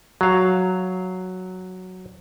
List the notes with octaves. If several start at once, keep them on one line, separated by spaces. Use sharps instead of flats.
F#3 F5